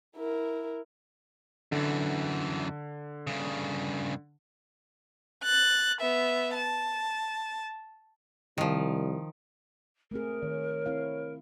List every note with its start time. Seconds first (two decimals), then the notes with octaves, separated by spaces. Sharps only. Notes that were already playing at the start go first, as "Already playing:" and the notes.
0.16 E4 A#4
1.72 F#2 D3 E3
3.27 G2 C#3
5.43 F#6 A6
6.01 B3 E5
6.54 A5
8.58 C2 D#3 F3
10.11 A3 C4 G#4 A#4
10.43 D#3 C#5
10.86 C4 E4 F5